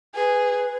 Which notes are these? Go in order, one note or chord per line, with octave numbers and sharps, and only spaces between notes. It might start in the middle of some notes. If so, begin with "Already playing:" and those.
G#4 B4